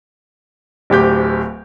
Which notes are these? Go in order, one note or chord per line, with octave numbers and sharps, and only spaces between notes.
D1 D2 G4 G6